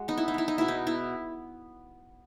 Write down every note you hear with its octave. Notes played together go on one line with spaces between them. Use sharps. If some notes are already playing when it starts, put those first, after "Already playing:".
Already playing: G#3 F#4
B3 D#4
E4
D#4
B3 E4
D#4
B2 E4
D#4
B3 E4